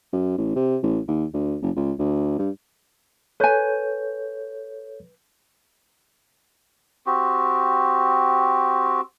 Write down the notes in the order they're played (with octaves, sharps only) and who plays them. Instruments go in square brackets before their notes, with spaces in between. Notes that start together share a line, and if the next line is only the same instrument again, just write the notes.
[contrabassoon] F#2
A1
C3
A1
D#2
D2
F#1
C#2
D2
G2
[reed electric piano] A4 C#5 G6 [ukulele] B4 G#5
[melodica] C4 F#4 G4